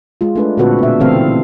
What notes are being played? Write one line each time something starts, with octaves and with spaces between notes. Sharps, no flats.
G#3 F4
A3 D4 B4
A#2 D3 C4 F#4 A4 B4
B2 E5
C#3 E3 A3 C4 A4 F5